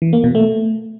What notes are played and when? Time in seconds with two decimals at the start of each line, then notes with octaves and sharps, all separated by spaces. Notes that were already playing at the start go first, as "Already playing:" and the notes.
0.02 E3
0.13 A#3
0.24 B2
0.35 A3